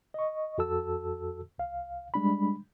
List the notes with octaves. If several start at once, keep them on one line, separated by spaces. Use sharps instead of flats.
D#5 C#6
F2 F#4 A4 A5 E6
C2 F5
G3 G#3 D4 B5